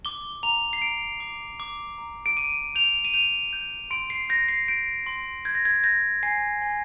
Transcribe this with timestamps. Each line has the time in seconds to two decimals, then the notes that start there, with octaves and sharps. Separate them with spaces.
0.05 D6 G7
0.43 A#5 F7
0.73 C7
0.82 A#5 D7
1.20 D6
1.60 D6
1.98 A#5
2.26 D7
2.37 D6 D#7
2.75 G6 F7
3.05 D#7
3.14 G6 F7
3.53 G6
3.91 C6 D7
4.10 C7
4.29 G6 A#6
4.49 C7
4.68 G6 D7
5.06 C6
5.45 G6 G#6
5.55 A#6
5.65 G#6
5.84 G6 A#6
6.23 G#5 C7
6.62 G#5